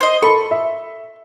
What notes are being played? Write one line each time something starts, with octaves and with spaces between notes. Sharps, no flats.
C5 D#5
A4 B5 C#6
E5